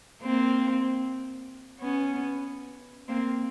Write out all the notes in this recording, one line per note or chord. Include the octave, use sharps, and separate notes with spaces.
A#3 C4
B3 C#4
A#3 C4